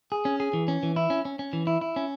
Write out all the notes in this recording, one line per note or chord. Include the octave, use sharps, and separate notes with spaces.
G#4
C#4
G#4
E3
C#4
E3
E4
C#4
C#4
C#4
E3
E4
E4
C#4